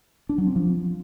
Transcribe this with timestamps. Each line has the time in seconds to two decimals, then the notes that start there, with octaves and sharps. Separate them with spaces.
0.29 D4
0.38 F#3
0.47 C4
0.56 F3